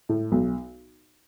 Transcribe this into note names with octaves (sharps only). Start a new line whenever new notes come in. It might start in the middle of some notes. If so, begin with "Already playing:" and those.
A2
B1